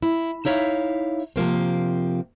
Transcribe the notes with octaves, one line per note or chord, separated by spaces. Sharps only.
E4
D#4 E4 C#5 E5 F5
C3 F3 A#3 C4